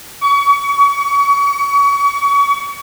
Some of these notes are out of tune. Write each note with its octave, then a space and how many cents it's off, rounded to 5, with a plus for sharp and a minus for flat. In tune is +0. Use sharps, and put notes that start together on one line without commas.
C#6 +35